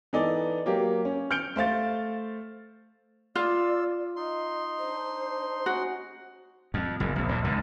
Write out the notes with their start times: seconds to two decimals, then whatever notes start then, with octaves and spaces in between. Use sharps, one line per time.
0.13 E3 B3 D#4 A4 D5
0.66 F#3 A#3 G4
1.05 C#4
1.31 F6 G6 C#7 D7 G7
1.56 A3 C5 F5 A6
3.35 F4 D5 E6
4.16 D#4 D#5 C6
4.80 D4 C5
5.66 C#4 F#4
6.74 F2
7.00 F#1 E2
7.16 A#1 E2
7.29 A#1 A#2
7.44 C#2 G#2 D3